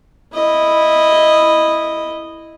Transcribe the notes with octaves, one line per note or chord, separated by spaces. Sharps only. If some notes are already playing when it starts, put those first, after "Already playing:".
E4 D#5